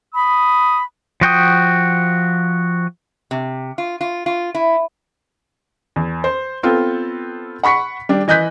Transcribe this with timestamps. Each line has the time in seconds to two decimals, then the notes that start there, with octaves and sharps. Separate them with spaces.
0.15 B5 D#6
1.21 F3 F#4 G5 D#6
3.31 C3
3.78 F4
4.01 F4
4.26 F4
4.55 E4
5.96 E2
6.24 C5
6.63 B3 C4 F4 A4
7.63 F#5 B5 C#6 B6 C#7
8.09 G3 D4
8.28 E3 D#5 F#6 G6 B6